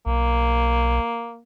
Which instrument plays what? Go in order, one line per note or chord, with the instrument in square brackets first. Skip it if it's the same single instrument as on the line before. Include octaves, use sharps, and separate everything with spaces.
[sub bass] B1 [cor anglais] A#3